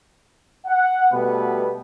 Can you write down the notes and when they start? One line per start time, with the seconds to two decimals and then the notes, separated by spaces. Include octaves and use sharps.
0.66 F#5
1.12 B2 G3 A3 B3 B4